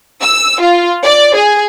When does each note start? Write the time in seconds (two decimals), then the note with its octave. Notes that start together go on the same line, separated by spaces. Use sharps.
0.23 E6
0.61 F4
1.04 D5
1.36 G#4